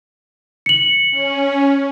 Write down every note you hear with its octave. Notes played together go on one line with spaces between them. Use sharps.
C#7 F#7
C#4